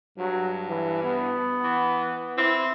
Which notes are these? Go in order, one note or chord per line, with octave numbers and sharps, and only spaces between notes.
G2 F#3
E3
B3
E3
C4 E4